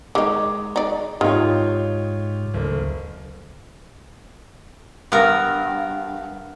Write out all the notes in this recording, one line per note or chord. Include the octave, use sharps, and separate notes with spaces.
D#3 G#3 D#4 D6
D#4 D5
G#2 D#3 D#4 F4 G4 C#5
F#1 D2 A3
G2 B3 A#4